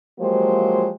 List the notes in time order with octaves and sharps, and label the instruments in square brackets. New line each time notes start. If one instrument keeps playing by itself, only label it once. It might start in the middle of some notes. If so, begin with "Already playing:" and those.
[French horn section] F3 F#3 G#3 A#3 G4 C5